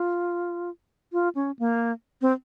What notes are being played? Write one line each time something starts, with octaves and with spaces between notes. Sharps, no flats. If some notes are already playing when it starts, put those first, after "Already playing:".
Already playing: F4
F4
C#4
A#3
C4